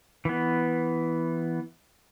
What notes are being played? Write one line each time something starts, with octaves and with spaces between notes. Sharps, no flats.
E3 B3